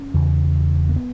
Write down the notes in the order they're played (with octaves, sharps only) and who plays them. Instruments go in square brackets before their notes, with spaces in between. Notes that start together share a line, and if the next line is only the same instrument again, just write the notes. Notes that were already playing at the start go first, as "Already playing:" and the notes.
Already playing: [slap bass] C#4
E2 C#3
A#3
B3